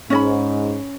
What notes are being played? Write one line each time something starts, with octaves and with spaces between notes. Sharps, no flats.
G#2 C#4 D#5 B5